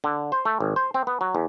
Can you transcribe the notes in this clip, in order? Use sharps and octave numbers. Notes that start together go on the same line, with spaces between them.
D3
C5
A3
G#1
C5
C4
B3
F#3
E2